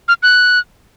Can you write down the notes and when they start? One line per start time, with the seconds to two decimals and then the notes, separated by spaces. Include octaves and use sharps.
0.08 F6
0.23 F#6